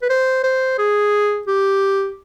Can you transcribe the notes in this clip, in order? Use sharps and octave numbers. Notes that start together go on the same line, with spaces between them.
B4
C5
C5
G#4
G4